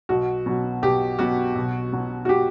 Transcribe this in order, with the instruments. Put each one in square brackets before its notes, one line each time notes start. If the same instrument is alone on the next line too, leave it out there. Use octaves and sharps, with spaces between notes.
[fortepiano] B1 [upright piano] F#4
[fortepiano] B2 F#3
[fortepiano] B1 [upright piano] G4
[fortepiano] B2 F#3 [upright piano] F#4
[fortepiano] B1
B2 F#3
[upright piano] F#4
G4